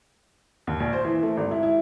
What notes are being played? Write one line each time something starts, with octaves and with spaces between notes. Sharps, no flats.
D#2
A#1
C5
E3
A3
G#1
E4
E4